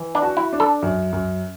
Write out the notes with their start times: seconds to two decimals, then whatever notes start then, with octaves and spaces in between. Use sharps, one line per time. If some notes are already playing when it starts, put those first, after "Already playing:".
Already playing: E3
0.15 D4
0.22 F#4
0.37 E4
0.53 D4
0.60 A4
0.83 F#2
1.13 F#2